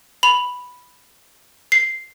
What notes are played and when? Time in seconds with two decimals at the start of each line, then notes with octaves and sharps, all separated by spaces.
0.23 B5 F7
1.72 C7